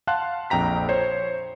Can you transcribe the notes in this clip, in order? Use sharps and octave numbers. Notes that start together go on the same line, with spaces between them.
F5 F#5 A5 C6 F#6
A#1 F2 G5 A#5 B6
C5 C#5